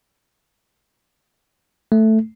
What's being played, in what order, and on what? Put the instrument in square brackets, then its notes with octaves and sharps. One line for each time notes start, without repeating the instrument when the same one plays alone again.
[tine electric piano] A3